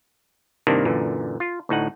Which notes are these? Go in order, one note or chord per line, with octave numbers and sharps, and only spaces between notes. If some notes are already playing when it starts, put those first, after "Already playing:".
G2 C3 D#3 A#3 D4 E4
F#2 A#2 D3 E3
F4
D2 A2 D#4 F#5